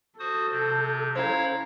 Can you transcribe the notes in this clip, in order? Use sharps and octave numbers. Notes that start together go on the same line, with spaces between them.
F#4 A4 C5 D#6
C3 G6
C#4 E4 C5 C#5 F5 A#5